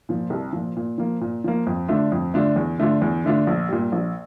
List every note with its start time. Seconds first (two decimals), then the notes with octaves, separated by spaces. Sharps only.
0.09 A#2 F3
0.30 C2
0.53 A#2 F3
0.76 A#2
0.98 F3 A#3
1.21 A#2
1.44 F3 A#3
1.67 F2
1.88 D3 A3 D4 F4
2.12 F2
2.34 D3 A3 D4 F4
2.56 E2
2.78 D3 A3 D4 F4
3.02 E2
3.24 D3 A3 D4 F4
3.47 A#1
3.69 A#2 G3
3.92 A#1